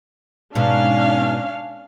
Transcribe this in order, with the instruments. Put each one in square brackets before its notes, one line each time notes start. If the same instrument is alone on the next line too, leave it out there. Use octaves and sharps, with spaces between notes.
[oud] G#2 B2 [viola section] C#4 D4 F5